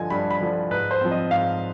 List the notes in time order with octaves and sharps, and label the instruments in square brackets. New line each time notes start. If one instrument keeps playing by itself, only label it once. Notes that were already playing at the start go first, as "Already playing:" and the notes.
Already playing: [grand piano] G2 D3 F3 D#5 G#5
G2 B5
B5
D3 F3
G#2 B4
C5
F3 C4
D#5
G#2 F5